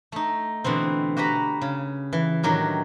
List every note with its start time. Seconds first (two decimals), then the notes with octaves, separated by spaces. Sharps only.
0.12 A3 D#4
0.64 B2 D3 E3 C4
1.17 F#4 G4 B4 A#5 B5
1.61 C#3
2.13 E3
2.43 A2 D#3 F#3 D4 G4